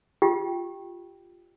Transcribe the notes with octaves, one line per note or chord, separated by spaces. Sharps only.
F4 G4 G5